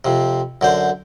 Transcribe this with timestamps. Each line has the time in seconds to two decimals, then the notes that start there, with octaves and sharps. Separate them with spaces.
0.05 F2 C3
0.61 F#2 D3 C5